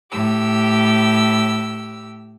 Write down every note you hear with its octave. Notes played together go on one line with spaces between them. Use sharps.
A2 G4 E6